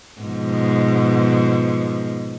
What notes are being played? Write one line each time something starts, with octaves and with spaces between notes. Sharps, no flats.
G#2 B2 F3